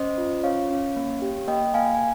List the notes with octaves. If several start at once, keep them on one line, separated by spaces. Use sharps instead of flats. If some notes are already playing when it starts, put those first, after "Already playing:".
Already playing: C#4 C5 D#5
F4
C#4 C#5 F5
C#4
A#3
G4
A#3 D#5 G5
A#3 F5 G#5
G#5